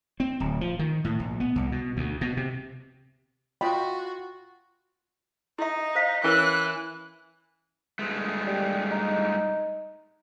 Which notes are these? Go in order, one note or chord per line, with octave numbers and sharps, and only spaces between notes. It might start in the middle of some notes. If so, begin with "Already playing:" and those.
C4
D1
F3
D#3
A2
A#1
B3
C2
B2
D2
B2
C3
F4 F#4 D#5 G5 B5
D#4 E4 E5
C5 F5
E3 C#4 A#4 C#5 F#6
G2 G#3 A3
G3
D#4